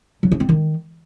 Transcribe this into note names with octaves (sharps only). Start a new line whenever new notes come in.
F#3
C#4
C4
D#3